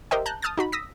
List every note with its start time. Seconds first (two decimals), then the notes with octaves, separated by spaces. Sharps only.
0.11 G4 A#4 C5 D#5 E5 G5
0.26 A5 A#5 F#6 G6
0.42 A5 D#6 F6 G6 A6
0.57 D#4 F#4 B5
0.72 D#6 E6 A#6 B6